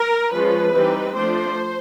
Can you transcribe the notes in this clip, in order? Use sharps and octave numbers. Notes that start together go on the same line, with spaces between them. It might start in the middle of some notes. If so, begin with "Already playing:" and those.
Already playing: A#4
F3 G#3 C#4 B4
E3 G3 C4 D#4
F3 A3 D4 C5